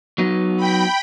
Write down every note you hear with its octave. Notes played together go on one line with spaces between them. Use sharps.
F#3 B3 D#4
G5 B5